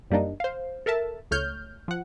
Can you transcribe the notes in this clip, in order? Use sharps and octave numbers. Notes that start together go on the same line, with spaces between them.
F#2 G3 A#3 D4 D#4
C5 F5
A4 A#4 E5 A5
C#2 A3 C#5 F6 G6
F3 F#5